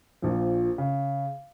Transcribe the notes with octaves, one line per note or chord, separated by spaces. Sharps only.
A#1 A#2 F3
C#3